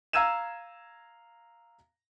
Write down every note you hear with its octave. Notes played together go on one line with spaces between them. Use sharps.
F5 A#5 E6 G#6 D#7 E7